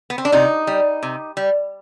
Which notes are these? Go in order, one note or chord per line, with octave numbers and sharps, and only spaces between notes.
B3
C4
D4
C3 D#4
G3
C3
G3